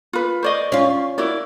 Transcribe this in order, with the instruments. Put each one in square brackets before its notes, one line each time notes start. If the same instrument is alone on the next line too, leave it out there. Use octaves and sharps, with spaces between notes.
[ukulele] F4 B4
[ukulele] C5 D5 D#5 [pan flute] C#6
[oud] C#4 F4
[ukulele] E4 F#4 D5 [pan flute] A#4